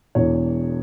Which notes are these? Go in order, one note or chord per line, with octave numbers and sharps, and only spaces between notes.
E1 E2 E3 C#5